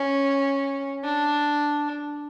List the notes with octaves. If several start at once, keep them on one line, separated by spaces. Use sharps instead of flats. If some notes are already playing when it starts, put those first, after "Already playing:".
Already playing: C#4
D4